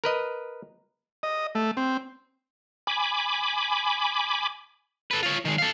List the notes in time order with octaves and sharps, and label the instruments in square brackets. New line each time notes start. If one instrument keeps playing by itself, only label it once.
[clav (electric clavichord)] A#4 B4 D#5
[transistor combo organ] D#5
A3
C4
[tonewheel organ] G#5 B5 D6
[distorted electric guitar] A4 B4
F4 C#5
D#3 G#3
A4 F5